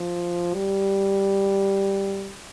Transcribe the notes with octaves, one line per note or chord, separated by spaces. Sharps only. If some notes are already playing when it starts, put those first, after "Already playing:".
Already playing: F3
G3